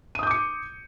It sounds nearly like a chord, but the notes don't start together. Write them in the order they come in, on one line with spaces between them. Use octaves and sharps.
D#7 D#6 G6 D6 C#7